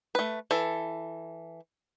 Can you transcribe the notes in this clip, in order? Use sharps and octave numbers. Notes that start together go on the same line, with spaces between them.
A3 B4
E3 A4